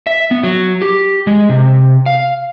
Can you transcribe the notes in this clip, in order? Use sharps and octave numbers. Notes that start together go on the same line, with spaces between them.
E5
B3
F#3
G4
G#3
C3
F5